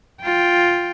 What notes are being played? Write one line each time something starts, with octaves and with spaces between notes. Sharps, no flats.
F4 G5